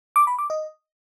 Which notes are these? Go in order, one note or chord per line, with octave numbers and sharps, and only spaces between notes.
D6
B5
D6
D#5